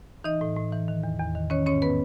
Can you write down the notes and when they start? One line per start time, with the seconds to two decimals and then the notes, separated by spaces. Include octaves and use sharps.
0.24 E3 D#4 D#5
0.41 A2
0.56 A2
0.73 E3
0.88 D#3
1.03 E2
1.19 E2
1.35 D#3
1.50 D#3 C#4 C#5
1.66 G#2 C#4 C#5
1.82 B3 B4